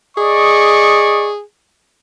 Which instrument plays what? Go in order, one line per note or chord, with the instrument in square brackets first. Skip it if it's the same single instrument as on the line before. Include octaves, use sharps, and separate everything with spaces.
[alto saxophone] G#4 [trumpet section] D5 D#5 C#6